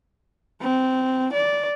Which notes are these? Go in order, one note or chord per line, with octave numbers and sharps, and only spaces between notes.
C4
D5